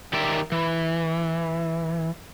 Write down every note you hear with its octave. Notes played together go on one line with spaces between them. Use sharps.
D#3 G4 A#4 D5 E5
E3